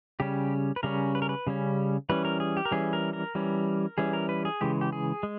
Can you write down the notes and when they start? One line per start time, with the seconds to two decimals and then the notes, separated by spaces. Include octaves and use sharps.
0.20 C#3 G3 C#4 G4
0.76 B4
0.83 C#3 G3 C#4 A#4
1.15 B4
1.22 A#4
1.29 B4
1.47 C#3 G3 C#4
2.09 E3 G3 C#4 B4
2.25 A#4
2.40 G#4
2.57 G4
2.65 A#4
2.71 E3 G3 C#4 G#4
2.93 A#4
3.13 A#4
3.35 E3 G3 C#4
3.98 E3 G3 C#4 G#4
4.13 A#4
4.29 B4
4.45 G#4
4.61 C#3 E3 G#3 G4
4.81 G4
4.93 G#4
5.23 G#3